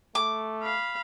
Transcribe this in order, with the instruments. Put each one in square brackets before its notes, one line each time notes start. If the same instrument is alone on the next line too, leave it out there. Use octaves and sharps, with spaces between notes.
[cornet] A3 [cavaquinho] D6
[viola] F5 B5